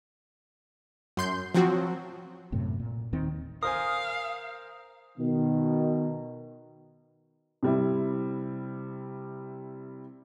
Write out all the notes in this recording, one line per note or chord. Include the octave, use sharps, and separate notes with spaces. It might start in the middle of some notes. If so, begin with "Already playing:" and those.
F#2 C6 G6
F3 F#3 C4 F#4
F#2 A2 C3
A#2
D#2 D#3 C4
A#4 C5 F5 G#5 D#6
B2 D#3
C3 G3 E4